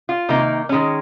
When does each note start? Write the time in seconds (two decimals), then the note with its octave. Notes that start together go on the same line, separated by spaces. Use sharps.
0.09 F4
0.29 C3 D#3 A#3 D#4
0.69 D#3 G#3 C#4